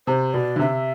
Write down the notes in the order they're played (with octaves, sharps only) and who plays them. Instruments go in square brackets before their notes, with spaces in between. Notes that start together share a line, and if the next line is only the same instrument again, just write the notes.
[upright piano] C3 [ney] C5
[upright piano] B2 [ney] D5
[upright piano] D3
[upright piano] C3 [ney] E5